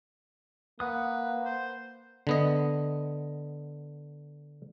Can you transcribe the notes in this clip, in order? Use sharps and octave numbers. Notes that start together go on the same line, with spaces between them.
A#3 B4 F#5 D#6
C5
D3 B3 D#5